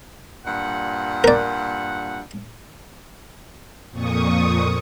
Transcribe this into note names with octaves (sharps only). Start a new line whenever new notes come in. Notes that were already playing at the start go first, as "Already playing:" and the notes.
G2 A#2 F#5
A#4 D5
F2 A#2 C#6 D#6